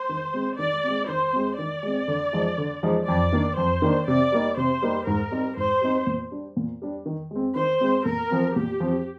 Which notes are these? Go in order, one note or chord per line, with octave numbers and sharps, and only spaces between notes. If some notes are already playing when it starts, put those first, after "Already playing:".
Already playing: C5
D#3
G#3 C4
D#3 D5
G#3 C4
D#3 C5
G#3 C4
D#3 D5
G#3 C4
D3
F3 G#3 D#4
D3
F3 G#3 D#4
F2 D5
D#3 A#3 D4
F2 C5
D#3 A#3 D4
C3 D5
G3 A#3 D#4
C3 C5
G3 A#3 D#4
G#2 A#4
G3 C4 D#4
G#2 C5
G3 C4 D#4
A#2
G3 D4
A#2
G3 D4
D#3
G#3 C4
D#3 C5
G#3 C4
A#2 A#4
F3 C4
A#2 G4
F3 C4